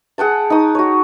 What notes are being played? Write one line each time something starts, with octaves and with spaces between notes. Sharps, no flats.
G#4 F#5 G5 A5
D#4 D#6
F#4 C#5